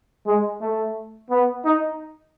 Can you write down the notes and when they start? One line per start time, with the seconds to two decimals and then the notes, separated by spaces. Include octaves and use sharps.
0.26 G#3
0.61 A3
1.30 B3
1.65 D#4